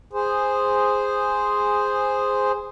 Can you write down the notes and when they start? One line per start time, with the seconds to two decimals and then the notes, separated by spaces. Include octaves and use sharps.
0.13 G#4 C5